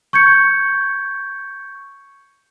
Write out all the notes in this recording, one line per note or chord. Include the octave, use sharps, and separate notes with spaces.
C#6 G6 G#6 C#7